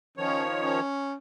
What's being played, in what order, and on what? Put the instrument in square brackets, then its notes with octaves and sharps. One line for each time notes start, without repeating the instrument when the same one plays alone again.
[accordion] D#3 F3 C#5 [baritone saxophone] C#4
[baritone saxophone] C#4